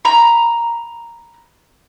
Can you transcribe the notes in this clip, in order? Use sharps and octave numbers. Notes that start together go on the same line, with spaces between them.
A#5 B5